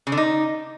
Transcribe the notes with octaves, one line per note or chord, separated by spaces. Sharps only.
C#3
D3
D#4